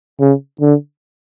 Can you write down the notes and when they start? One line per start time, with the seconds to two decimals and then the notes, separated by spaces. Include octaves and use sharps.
0.20 C#3
0.61 D3